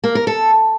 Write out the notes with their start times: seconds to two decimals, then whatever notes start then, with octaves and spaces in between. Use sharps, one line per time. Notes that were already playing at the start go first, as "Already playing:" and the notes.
0.04 A#3
0.15 A#4
0.27 A4